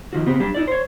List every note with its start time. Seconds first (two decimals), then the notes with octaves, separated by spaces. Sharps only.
0.13 D#3 F3 F#4
0.26 C#3 B3 C4 G4
0.40 F#3 G3 D4 G4
0.55 D#4 E4 D5
0.68 C5 C#5